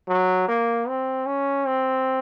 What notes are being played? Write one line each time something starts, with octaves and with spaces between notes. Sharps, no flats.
F#3
A#3
C4
C#4
C4